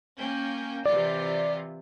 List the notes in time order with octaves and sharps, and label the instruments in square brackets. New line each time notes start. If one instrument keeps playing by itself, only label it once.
[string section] A#3 C#4 G5
[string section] C3 E3 F4 [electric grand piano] D5